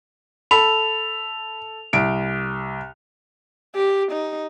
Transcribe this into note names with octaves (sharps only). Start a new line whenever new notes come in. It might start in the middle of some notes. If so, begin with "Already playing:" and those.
A4 B5 F7
C2 D7
G4
D#4